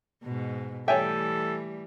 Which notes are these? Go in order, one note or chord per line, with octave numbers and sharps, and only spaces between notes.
G#2 B2
E3 G3 A3 A4 C#5 E5 G5 G#5